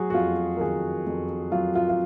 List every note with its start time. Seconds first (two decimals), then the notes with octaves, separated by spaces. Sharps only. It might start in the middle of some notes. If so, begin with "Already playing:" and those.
Already playing: F#3 F#4 G#4
0.10 F#4
0.14 F2 F4
0.57 A#4
0.61 D#3 G#4
1.06 F2
1.51 F#3 F4
1.75 F4
1.89 F4